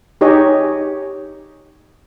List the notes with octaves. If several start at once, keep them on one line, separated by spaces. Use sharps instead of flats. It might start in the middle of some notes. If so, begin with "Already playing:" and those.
D#4 G4 G#4 C#5 D#5